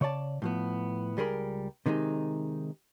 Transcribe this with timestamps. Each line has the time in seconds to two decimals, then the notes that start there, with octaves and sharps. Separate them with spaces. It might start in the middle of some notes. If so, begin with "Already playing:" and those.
0.01 C#3 C#5 D5 A5
0.42 A2 F3 B3
1.17 C#2 G3 G#4 A#4 B5
1.86 C3 D#3 G#3 D4 D#4